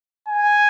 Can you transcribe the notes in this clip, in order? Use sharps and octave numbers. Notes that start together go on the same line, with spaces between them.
G#5